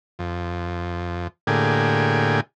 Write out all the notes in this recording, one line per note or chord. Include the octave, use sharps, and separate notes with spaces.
F2
A2 D3 A#3 G4 G#4